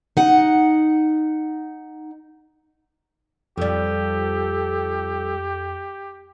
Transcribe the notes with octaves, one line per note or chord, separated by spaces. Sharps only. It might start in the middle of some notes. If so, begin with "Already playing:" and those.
D#4 F#5
F2 F3 G3 G4 A4